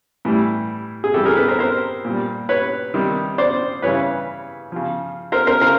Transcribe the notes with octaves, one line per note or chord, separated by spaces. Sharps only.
A2 E3 G3
G#4
C3 E3 G3 G4 A4
G#4 A#4
A4 B4
A#4 C5
A#4 C5
A#2 G3
B4 C#5
C3 D#3 G3
C5 D5
C#3 E3 G3 B4 C#5
C#3 F3
A#4 C5
A#4 C5
C#3 A#4 C5